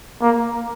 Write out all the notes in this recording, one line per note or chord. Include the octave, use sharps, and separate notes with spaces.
A#3